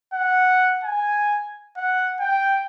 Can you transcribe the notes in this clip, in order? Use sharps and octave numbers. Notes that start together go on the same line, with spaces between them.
F#5
G#5
F#5
G5